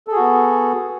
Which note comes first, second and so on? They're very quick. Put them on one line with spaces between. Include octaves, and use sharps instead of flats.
A4 G#4 F#4 B3